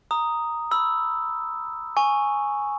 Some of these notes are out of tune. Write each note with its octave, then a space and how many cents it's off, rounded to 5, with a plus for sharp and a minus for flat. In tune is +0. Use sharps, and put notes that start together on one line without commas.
A#5 +0 D#6 +0
B5 +0 E6 +0
G#5 +0 C#6 +0